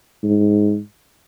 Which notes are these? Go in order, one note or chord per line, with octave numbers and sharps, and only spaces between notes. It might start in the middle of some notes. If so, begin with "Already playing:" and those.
G#2